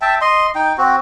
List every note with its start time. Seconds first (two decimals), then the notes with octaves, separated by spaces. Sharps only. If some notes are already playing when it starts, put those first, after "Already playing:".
0.02 E5 G5 A5
0.21 D#5 C6
0.55 D#4 G5
0.78 C4 F#4